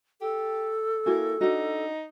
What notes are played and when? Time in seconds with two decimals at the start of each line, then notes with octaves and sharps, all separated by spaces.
0.21 G4 A4
1.06 A#3 E4 F#4 G#4
1.41 D4 D#4 F#4